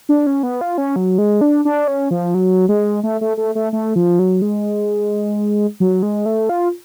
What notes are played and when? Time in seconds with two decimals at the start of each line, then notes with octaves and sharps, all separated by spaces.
0.09 D4
0.27 C#4
0.43 B3
0.61 F4
0.78 C#4
0.96 F#3
1.18 G#3
1.41 D4
1.65 D4
1.88 C#4
2.11 F3
2.34 F#3
2.69 G#3
3.03 A3
3.21 A3
3.37 A3
3.55 A3
3.73 A3
3.96 F3
4.19 F#3
4.42 G#3
5.80 F#3
6.03 G#3
6.26 A3
6.49 F4